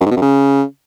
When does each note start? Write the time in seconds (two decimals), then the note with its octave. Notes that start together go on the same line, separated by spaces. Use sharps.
0.01 F#2
0.06 G#2
0.11 B2
0.17 F#2
0.22 C#3